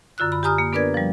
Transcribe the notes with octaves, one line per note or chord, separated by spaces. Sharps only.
F#2 D3 F4 E6 F#6
B5
G4 G#5 A#5 D#6 F6
A#3
B3 D4 A#4 B4 D5 G#6
F3 G3